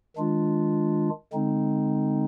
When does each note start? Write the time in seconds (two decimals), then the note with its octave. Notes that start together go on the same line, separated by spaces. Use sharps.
0.16 D#3 G#3 D4 F4
1.33 D3 G#3 C4 D#4